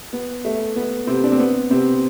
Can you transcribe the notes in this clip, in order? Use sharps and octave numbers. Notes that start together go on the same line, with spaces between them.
B3
A3
B3
C3 C4
D4
C4
B3
C3 C4